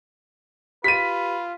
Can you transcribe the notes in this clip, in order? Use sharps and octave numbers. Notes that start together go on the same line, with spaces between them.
F4 G4 B4 B6 D#7